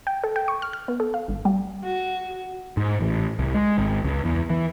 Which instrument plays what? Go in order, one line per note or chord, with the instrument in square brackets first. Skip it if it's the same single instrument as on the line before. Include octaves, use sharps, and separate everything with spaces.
[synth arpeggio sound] G5
A4
G5
C#6
F6
F6
B3
A4
F5
G#1
G3
[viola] F#4
[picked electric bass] G#2
A1
C2
G#3
G#1
C#2
E2
E3